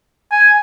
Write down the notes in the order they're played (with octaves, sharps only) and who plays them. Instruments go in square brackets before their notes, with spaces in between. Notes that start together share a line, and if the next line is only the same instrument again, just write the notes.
[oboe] G#5